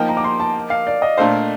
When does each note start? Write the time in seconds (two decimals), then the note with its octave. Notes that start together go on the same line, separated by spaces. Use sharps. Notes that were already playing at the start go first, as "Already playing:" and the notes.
Already playing: F3 A#3 D#4 A#4 G5
0.09 A#5
0.17 D6
0.24 C6
0.40 A5
0.70 F5
0.87 D5
1.02 D#5
1.17 A#2 A3 D4 A4 C5 F5